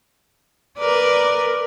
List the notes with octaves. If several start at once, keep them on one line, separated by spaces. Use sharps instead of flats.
A#4 B4 D5